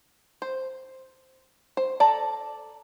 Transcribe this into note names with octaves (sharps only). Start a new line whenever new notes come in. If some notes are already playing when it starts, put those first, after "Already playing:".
C5
C5
A4 D5 A5 A#5